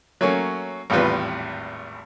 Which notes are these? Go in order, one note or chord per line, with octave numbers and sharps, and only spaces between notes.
F#3 A3 A#3 C#4
G#1 E2 A2 G3 F4 B4